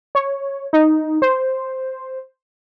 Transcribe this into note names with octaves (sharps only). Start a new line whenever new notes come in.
C#5
D#4
C5